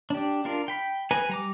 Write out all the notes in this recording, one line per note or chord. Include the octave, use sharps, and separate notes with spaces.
D4 G4
D4 F4 A#4
G5 B5
B4 G#5 A#5 B5
G3 A#5 D6